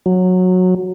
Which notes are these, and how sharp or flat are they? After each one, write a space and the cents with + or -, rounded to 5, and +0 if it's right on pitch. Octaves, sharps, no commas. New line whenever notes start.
F#3 -15